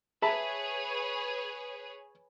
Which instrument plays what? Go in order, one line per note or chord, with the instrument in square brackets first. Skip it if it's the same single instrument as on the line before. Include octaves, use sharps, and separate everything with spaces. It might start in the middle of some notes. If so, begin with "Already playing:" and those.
[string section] G#4 B4 C#5 [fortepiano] E5 A5 B5